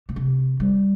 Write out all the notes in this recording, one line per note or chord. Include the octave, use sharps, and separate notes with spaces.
A#2
C3
G3